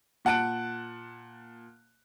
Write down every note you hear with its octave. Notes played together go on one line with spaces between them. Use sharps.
A#2 F#5 A5 F#6 D7